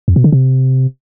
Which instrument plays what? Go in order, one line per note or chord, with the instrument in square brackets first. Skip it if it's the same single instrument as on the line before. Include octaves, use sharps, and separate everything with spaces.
[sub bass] F2
B2
D3
C3